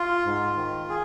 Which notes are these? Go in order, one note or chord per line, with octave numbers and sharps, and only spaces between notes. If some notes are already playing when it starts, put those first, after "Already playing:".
Already playing: F4
G#2
D#3
G#4